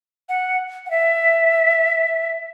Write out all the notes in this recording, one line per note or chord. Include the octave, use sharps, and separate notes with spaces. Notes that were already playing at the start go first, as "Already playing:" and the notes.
F#5
F#5
E5